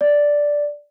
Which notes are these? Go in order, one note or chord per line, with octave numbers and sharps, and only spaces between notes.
D5